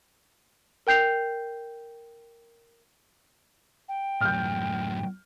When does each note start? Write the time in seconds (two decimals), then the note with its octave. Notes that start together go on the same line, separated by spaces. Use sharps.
0.87 A#4 G5 G6 C7 F7
3.89 G5
4.21 F#2 A2 F6 G6